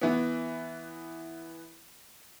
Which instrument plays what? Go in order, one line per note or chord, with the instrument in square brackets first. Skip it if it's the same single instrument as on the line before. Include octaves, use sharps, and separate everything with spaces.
[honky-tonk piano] E3 B3